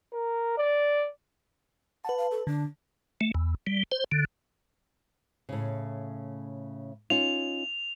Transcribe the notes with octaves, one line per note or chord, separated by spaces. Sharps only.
A#4
D5
B4 F#5 A5
F5
A4
D3 D4
A3
E2
G3
C5
D3
A2 C#3
C#4 D#4 F4 F7